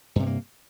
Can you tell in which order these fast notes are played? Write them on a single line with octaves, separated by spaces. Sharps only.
G2 C3 A3 A#3